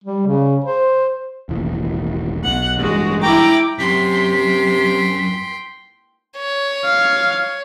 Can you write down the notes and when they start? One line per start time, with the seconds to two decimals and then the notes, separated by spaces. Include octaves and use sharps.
0.04 G3
0.27 C#3
0.64 C5
1.49 E1 A1 D#2
2.44 B1 B2 F#5
2.79 A1 G2 G#3 F#4
3.23 E4 G5 A#5 D6
3.79 F#2 C3 G5 C6 B6
6.37 C#5
6.85 F5